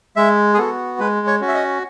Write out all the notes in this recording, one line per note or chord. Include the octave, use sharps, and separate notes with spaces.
G#3 E5
G#4
B3 F#4 A4
G#3 B4
C#5
C#4 F#4
E5
D#5